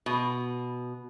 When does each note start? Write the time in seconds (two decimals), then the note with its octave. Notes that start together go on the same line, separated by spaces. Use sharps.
0.06 B2